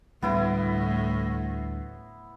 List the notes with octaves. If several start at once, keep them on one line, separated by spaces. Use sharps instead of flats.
D2 A2 G3 A3 B3 E4 C6